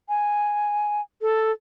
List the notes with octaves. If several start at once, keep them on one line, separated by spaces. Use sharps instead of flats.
G#5
A4